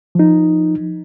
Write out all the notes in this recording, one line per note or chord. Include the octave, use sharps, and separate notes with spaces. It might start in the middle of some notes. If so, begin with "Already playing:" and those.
F3 D#4